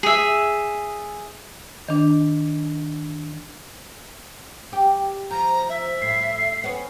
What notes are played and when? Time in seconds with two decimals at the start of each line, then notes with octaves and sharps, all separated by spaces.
0.03 G#4 E5
1.88 D#3 D4
4.73 G4
5.31 F3 A#5
5.69 E5
6.02 A2 C7
6.64 B3 C#4